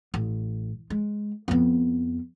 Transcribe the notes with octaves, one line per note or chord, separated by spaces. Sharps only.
A1
G#3
F2 B3